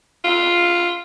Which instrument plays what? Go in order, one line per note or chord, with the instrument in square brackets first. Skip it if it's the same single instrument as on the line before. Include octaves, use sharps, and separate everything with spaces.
[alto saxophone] F4